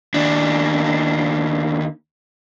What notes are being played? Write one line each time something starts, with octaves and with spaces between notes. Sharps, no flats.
D#2 D4